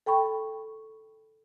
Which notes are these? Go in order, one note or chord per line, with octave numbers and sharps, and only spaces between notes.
A4 G5 B5 C#6